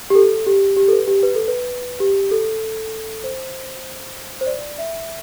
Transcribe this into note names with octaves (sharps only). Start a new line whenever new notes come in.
G4
A4
G4
G4
A4
B4
G4
B4
A4
B4
G4
A4
C5
C5
D5
E5